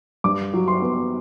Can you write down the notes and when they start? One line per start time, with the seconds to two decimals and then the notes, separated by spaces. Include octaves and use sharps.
0.24 G2 D6
0.53 F#3
0.68 C6
0.82 B3